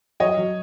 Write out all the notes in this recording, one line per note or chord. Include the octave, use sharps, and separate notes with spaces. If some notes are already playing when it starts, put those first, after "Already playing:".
F#3 C#5 D#5
F#3